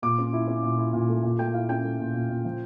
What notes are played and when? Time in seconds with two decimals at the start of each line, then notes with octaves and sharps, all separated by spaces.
0.02 A#2 D6
0.18 C#4
0.33 E4
0.47 C#4
0.63 A#2
0.78 E4
0.93 A#2
1.09 A3
1.23 A#2
1.38 A3 G5
1.54 E4 F5
1.69 C#4 G5
1.84 A3
1.99 A#2
2.14 A#2
2.29 A#2
2.45 F3